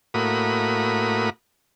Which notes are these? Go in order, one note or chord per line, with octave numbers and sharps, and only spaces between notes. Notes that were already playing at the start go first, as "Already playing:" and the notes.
A2 A#3 F#4 B5 D#6